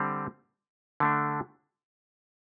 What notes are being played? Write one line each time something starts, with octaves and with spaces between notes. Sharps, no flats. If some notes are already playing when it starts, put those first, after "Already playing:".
Already playing: D3 G3 C4
D3 A3 D4